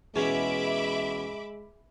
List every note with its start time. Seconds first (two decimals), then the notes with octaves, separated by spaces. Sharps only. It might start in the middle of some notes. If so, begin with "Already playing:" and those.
0.16 E2 B2 G#3 C#4 G#4 E5 B5 D6